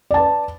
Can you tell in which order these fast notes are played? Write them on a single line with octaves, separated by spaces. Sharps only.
D5 A5 B4